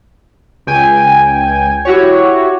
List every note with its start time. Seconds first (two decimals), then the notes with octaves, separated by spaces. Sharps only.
0.67 C#2 G5 G#5
1.85 E4 F#4 G4 C#5